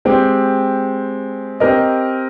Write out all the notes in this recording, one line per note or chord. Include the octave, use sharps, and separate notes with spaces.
G#3 C4 G4
C4 G4 A#4 D#5